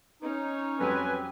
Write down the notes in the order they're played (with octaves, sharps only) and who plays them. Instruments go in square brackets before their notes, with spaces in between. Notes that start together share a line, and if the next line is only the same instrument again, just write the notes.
[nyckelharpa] C#4 C#5 [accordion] D#4
[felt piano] F2 F#3 G3 [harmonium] C4 [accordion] B4 G#5